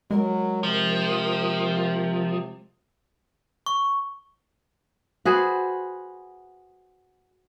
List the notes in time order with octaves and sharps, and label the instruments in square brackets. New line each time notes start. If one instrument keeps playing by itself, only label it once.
[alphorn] F#3 [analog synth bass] G#3 [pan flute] A#4
[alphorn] C3 [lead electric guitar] F3
[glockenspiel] C#6
[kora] F#4 G#4 B4 C5